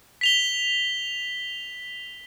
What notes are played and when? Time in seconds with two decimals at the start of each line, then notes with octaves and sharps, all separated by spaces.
0.21 B6 F7 G7